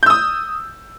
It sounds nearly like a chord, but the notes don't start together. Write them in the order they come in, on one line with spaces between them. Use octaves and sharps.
G6 E6 D#6